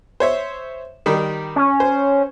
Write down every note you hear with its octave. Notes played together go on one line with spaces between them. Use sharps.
C5 C#5 E5
D#3 G3 A#4
C#4
C5